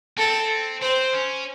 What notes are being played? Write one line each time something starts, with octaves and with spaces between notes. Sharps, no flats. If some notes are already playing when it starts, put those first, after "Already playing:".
C4 A4
C4 C5
C#4